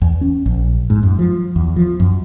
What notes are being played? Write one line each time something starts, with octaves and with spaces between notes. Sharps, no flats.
E2
C#4
A#1
G#2
F#2
F3
E2
F3
F#2